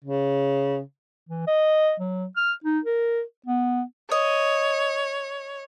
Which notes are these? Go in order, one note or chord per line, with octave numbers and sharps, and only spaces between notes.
C#3
E3
D#5
F#3
F6
D#4
A#4
B3
C#5 D#5